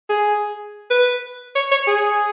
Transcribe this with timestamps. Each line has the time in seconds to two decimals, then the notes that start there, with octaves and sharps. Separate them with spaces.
0.09 G#4
0.90 B4
1.55 C#5
1.71 C#5
1.87 G#4